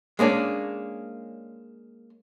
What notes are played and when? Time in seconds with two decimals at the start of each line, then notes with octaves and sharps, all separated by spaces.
0.19 G#3 A#3 C#4 D4